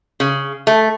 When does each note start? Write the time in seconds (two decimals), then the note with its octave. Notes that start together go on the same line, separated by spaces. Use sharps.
0.20 C#3
0.67 A3